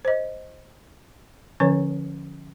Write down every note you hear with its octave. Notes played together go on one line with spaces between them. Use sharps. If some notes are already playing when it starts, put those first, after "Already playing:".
C5 D#5
D3 F3 C#4 B4 C#5